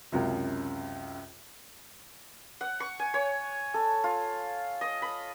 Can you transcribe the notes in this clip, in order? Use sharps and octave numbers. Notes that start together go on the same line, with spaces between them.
C#2 F#2 C3
F#5
C#6
G#5
C#5
A4
F4
D#5
B5